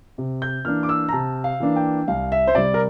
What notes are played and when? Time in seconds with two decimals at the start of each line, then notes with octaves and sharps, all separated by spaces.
0.18 C3
0.42 G6
0.65 E3 A#3 D4 F6
0.83 D6
0.89 E6
1.09 A#5
1.13 C3 A5
1.44 F5
1.60 E3 A#3 D4
1.76 G5
2.08 C2 F5
2.32 E5
2.47 C5
2.55 C3 G3 D5
2.74 A#4